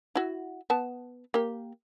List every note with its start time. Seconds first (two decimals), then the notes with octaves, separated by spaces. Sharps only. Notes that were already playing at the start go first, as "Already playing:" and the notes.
0.15 E4 F#4
0.70 B3 A5
1.34 A#3 G4